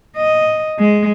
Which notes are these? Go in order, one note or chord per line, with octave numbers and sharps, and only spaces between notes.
D#5
G#3